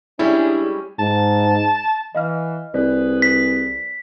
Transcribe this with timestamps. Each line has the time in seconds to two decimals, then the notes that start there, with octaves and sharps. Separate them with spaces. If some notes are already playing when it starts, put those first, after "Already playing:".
0.19 G3 G#3 C#4 D4 E4 G#4
0.99 G#2 A5
2.15 E3 D#5 F5 F6
2.74 C2 G#4 B4 C5 D5
3.22 B6